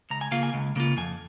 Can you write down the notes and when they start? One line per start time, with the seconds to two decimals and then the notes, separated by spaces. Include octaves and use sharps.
0.10 C#2 A#5
0.21 G#5
0.31 C#3 A#3 F4 F5
0.43 G#5
0.54 C#2
0.76 C#3 A#3 F4
0.97 F2 G#5